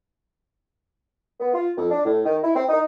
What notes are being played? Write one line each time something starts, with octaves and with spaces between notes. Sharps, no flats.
B3
F4
F2
D4
A2
D#3
E4
C4
D#4